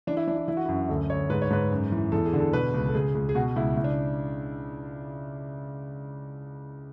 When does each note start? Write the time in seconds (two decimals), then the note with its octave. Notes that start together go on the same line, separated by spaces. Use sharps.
0.07 E3 D4
0.17 E4
0.27 E3 D4
0.38 E4
0.48 E3 E4
0.57 F#4
0.65 E4
0.68 F#2
0.88 D2 A4
1.10 D2 C#5
1.30 G#2 B4
1.42 C#5
1.50 G#2 B4
1.71 F#2
1.92 E3
2.12 E2 A4
2.26 G#4
2.33 D3
2.40 A4
2.53 B2 B4
2.74 C#2
2.88 A4
2.95 C#2 G#4
3.15 C#2
3.29 G#4
3.35 B2 F#4
3.56 C#2 E4
3.77 C#2 E4
3.84 D4